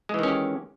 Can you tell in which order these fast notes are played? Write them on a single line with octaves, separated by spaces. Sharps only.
G#3 E3 D#3 C#4 G4